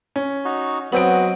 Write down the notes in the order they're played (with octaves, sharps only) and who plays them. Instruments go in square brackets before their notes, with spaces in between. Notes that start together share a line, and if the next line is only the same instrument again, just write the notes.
[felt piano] C#4
[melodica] D#4 F#4
[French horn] F#3 [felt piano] B3 C4 D7 [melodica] D#5 [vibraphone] F#5